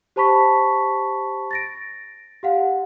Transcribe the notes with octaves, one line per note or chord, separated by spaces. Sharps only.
G4 C5 A5 B5 C#6 B6
A6 A#6 D7
G4 F5 F#5